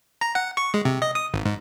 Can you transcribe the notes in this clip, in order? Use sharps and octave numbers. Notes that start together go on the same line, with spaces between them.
A#5
F#5
C#6
G#3
C3
D#5
D#6
G#1
G#2